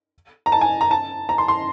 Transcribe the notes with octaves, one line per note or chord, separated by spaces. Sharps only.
A#5
A5
G#5
A#5
A5
A#5
C6
C6